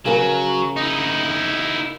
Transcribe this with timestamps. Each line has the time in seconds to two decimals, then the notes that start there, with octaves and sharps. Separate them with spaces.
0.06 C#3 F#3 A#4
0.76 D#4 E4